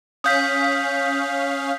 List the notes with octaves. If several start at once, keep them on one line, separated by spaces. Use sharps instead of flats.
C#4 F5 D#6 G6 B6